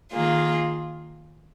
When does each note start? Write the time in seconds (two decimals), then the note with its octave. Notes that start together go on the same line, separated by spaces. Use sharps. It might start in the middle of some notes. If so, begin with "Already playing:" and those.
0.13 D#3 A#3 F4 G#4